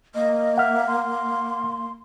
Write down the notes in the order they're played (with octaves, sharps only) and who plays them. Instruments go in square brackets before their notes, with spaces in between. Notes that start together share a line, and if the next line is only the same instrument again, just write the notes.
[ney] A#3 [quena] D#5
[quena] E5 [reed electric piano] F#5 F6
[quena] C6